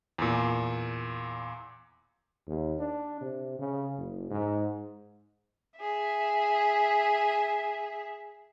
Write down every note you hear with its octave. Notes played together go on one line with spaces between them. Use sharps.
E2 A#2
D#2
D4
C3
C#3
F#1
G#2
G#4 E5